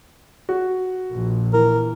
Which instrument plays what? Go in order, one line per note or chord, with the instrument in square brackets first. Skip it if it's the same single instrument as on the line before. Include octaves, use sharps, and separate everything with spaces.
[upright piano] F#4
[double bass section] A#1
[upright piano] E3 [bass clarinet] A#4